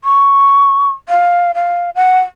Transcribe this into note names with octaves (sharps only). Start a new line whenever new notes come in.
C#6
F5
F5
F#5